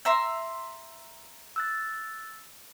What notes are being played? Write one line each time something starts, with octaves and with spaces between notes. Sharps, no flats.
E5 A#5 C6
E6 F#6 A6